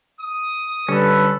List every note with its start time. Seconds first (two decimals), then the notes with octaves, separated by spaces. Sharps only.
0.20 D#6
0.89 D3 G3 C#4 A4 B4